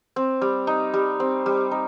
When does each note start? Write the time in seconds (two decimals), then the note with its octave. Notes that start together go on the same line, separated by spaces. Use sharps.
0.16 C4
0.41 G3
0.67 D#4
0.94 G3
1.20 C4
1.46 G3
1.71 D#4